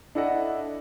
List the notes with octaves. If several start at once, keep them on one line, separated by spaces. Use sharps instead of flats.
D4 E4 A4 D#5 F#5